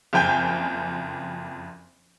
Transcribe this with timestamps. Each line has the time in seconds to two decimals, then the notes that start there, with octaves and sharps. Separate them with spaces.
0.13 F#1 F2 G5 G#5 G6